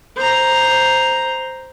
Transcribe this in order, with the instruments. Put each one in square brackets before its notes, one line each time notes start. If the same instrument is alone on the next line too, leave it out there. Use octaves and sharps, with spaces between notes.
[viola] C5 A#5